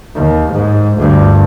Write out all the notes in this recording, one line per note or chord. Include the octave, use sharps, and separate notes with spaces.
D#2
G#2
D2 G2